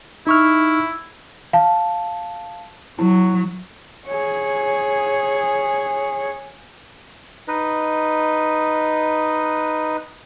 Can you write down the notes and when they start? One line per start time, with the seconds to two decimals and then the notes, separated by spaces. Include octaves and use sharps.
0.27 D#4 E4 C#6 F6
1.53 F5 A5
2.99 F#3 E4
4.07 G#4 C#5
7.48 D#4 B4 D#5